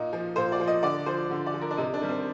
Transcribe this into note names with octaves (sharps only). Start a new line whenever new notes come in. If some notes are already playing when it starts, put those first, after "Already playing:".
Already playing: A#2 D#4
F3
A#2 C5
D5
F3
D#5
D3 D5
F3 C5
D3
D5
F3
A#4
D4
C3 D#4
D4
D#3 G3
C4